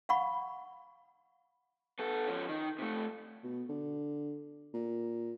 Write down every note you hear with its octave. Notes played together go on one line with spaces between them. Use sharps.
F5 F#5 B5 C#6
B3 A4
F3 C#4
D#3
C3 A3
B2
D3
A#2